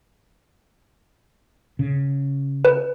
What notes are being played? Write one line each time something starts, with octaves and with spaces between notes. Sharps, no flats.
C#3
B4